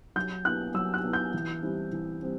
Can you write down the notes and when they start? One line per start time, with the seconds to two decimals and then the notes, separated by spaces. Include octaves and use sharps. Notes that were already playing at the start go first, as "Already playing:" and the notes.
0.16 F#3 G6
0.45 B3 E4 F#6
0.74 F#3 E6
0.94 F#6
1.04 B3 E4
1.13 G6
1.34 E3
1.62 G3 C4 E4
1.93 E3
2.22 G3 C4